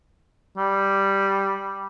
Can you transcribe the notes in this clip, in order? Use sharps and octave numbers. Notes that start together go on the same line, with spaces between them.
G3